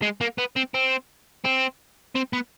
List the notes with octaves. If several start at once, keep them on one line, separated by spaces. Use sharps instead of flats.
G#3
A#3
B3
C4
C4
C4
C4
B3